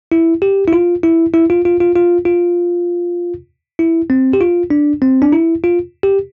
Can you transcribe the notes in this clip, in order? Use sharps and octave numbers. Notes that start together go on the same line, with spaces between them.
E4
G4
E4
F4
E4
E4
F4
F4
F4
F4
F4
E4
C4
G4
F4
D4
C4
D4
E4
F4
G4